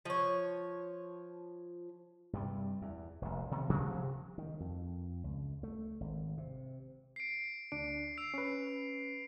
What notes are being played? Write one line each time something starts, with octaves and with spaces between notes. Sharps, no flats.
F3 C#5
G2 C3 G3
E2
F1 A#1
C3 D#3 B3
C3 F3 F#3 A#3
D#3
F2
C#2
A3
G#1
C3
C7 D7
D2 D4 D7
E6 C7 D7 F7
C#4 B4